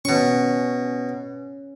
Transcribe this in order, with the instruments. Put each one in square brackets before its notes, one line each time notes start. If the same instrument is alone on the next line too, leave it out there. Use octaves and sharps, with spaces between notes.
[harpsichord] B2 C#6 [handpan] C#4